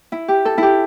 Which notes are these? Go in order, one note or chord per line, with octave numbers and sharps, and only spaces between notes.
E4
G4
A4
E4 G4